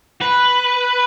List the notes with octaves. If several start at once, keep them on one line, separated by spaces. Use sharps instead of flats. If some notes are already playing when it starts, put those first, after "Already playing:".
B4